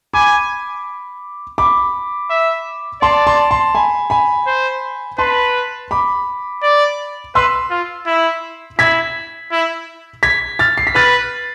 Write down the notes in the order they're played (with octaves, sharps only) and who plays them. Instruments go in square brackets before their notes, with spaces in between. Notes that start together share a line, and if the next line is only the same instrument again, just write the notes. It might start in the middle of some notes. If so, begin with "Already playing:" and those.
[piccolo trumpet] G#5 [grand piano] B5 D6
[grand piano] B5 D6
[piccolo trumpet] E5
[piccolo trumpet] D5 [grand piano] A5 C6
[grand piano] A5 C6
A5 C6
G#5 B5
G#5 B5
[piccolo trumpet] C5
[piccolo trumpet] B4 [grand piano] A5 C6
[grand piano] B5 D6
[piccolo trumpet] D5
[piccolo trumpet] B4 [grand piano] C6 E6
[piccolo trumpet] F4
E4
[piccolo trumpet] E4 [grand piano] G#6 B6
[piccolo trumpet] E4
[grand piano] G#6 B6
F6 A6
C7
B6
[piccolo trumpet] B4 [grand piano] F6 A6